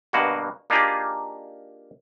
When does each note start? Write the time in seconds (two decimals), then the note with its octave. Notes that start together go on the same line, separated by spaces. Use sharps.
0.13 G2 B2 A#3 F#4
0.70 A#3 D4 D#4 F4 G4 G#4